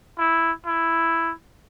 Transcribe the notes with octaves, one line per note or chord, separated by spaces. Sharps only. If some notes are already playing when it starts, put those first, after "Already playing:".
E4
E4